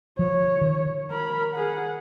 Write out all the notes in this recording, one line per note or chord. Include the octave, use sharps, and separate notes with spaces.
F3 C#5
D#3
A#4 B5
G#4 F#5